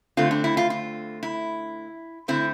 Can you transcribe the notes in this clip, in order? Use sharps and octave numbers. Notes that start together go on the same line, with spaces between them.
D3 A3 C4 F4
D4
E4
F4
F4
E4
D3 A3 C4 E4